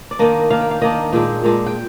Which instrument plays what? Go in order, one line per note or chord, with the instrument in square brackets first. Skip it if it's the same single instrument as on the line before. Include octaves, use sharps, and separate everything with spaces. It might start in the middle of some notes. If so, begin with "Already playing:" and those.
[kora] D5
D#3 A#3 D4 D#5
D#3 A#3 D4 F5
G5
F5
D#3 A#3 D4 D#5
A#2 G#3 D4 G5
A#2 G#3 D4
G5